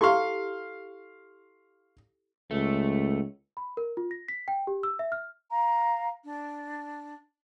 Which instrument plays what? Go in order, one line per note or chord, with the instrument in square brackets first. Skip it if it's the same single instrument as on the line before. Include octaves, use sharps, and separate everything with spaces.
[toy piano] E4 G4 A4 [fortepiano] F5 C6 C#6
[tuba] C#2 [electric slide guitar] A3
[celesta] B5
A#4
F4
A#6
B6
G5
G4
E6
E5
F6
[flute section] F5 A#5
D4